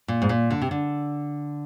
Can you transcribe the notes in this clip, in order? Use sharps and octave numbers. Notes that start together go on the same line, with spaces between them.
A#2
G#2
A#2
D3
C3
D3